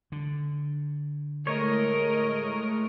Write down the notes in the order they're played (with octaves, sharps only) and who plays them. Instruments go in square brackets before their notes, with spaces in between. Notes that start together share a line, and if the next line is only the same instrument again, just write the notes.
[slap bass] D3
[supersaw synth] A2 G#3 A3 [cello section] A#4 D#5 [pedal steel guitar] C#5